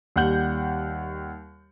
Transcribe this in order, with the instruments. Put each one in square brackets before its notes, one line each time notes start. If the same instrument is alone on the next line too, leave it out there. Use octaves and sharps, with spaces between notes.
[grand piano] D#2 G3 F#5 G6 F#7